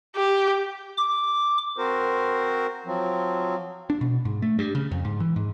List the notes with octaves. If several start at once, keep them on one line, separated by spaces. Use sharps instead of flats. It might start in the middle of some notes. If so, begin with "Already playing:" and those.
G4
D6
C4 F#4 A#4 C5
F3 F#3 C4
D4
B2
G#2
A3
G2
C#3
F2
G#2
E3
G#2